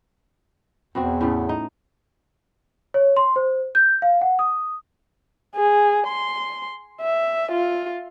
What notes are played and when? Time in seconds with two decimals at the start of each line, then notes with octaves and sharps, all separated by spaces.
0.95 E2 B2 C4 F#4
1.21 A2 C#3 A3
1.49 D#4
2.94 C#5
3.17 C6
3.36 C5
3.75 G6
4.02 F5
4.21 F#5
4.39 D#6
5.56 G#4
6.07 C6
7.01 E5
7.52 F4